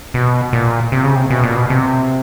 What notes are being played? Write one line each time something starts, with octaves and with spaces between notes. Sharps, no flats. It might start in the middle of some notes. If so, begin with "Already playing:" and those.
B2
A#2
C3
C#3
C3
B2
A#2
B2
C3